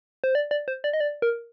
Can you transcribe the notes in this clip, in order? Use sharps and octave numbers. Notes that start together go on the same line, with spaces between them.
C5
D5
D5
C5
D5
D#5
D5
A#4